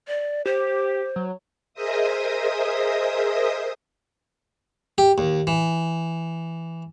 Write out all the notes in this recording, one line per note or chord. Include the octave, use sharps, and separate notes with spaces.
D5
G4 C5
F#3
G#4 A#4 C5 D#5 E5 D#6
G4
D#2
E3